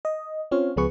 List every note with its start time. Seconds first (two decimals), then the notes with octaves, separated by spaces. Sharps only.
0.05 D#5
0.51 C4 C#4 F4 C#5 F5
0.76 C#2 F3 B3 G#4 B4 C#6